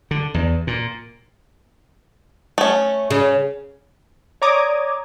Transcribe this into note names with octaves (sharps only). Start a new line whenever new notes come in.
D3
E2
A#2
A3 C#4
C#3
C#5 D5 A#5 D6 D#6 G#6